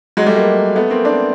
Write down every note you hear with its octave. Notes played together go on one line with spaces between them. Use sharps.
F#3 G#3
G3 A3
G#3 A#3
A3 B3
A#3 C4
C4 D4